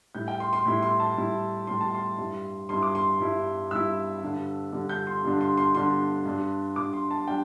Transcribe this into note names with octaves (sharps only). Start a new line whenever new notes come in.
A2 G3 E4 G6
G5
C6
C6
A2 G3 E4
C6
A5
A2 G3 E4
A2 G3 E4 C6
A5
C6
G2 G3 E4
G2 G3 E4 C6
D6
C6
G2 G3 E4
G2 G3 E4 E6
G2 D3 G3 D4
G2 D3 G3 D4
G6
C6
G2 D3 G3 D4
C6
C6
G2 D3 G3 D4 C6
G2 G3 D4
G2 G3 D4 D6
C6
A5
G3 D4 G5